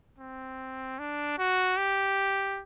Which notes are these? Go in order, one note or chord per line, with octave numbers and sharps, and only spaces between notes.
C4
D4
F#4
G4